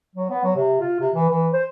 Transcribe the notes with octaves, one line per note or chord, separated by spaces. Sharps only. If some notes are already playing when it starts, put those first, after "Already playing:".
F#3
B3
F#3
C3
F4
C3
E3
E3
C5